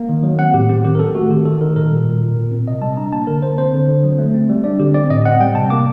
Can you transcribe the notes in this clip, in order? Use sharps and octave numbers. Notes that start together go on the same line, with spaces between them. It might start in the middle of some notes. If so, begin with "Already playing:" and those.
Already playing: A#3
D#3
F#3
C4 F#5
A2 G4
C4 G4
D#3 G4
A#4
C4 A4
A3 F#4
D#3 G4
D#3 A4
D#3 A#4
A#2 A#4
G3
A#2
A#2
A#2
C4
C3 D#5
G3 A5
D4 A#5
A#3 A5
D3 A#4
D3 C5
C4 C5
D3
D3
F#3
A3
C4
G3
D4 D5
D3 G4
C4 D5
A2 D#5
C4 F#5
G3 G5
C3 A5
A#3 D6